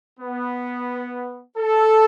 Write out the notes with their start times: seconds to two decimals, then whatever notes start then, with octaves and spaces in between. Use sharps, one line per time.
0.20 B3
1.57 A4